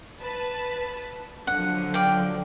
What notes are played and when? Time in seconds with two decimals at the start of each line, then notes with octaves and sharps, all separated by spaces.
0.20 B4 A5
1.47 D3 F3 F#3 F#5
1.94 D5 F5 G5